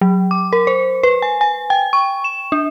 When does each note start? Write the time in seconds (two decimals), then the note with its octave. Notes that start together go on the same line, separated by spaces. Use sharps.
0.01 F#3
0.31 D6
0.53 A#4
0.67 C5
1.03 B4
1.22 G#5
1.41 G#5
1.70 G5
1.93 C#6
2.24 E7
2.52 D4